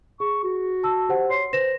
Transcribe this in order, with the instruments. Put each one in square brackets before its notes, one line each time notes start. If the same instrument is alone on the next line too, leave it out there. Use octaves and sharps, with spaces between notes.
[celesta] G#4 [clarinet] C#6
[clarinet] F#4
[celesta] A5 E6
G4 C5 F#5
[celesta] C#5 [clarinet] C6
[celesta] B4 A#6 E7 [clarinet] C5